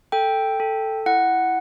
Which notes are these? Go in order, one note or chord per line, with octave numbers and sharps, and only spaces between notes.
A4 G5
A4
E4 F#5